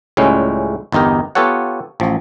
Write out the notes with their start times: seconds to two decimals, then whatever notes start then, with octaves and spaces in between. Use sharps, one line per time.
0.17 C#2 A2 G3 G#3 C#4
0.92 G1 E2 D#4 G4 A#4
1.35 B3 F4 G4 A4 C#5 F#5
2.00 A1 F3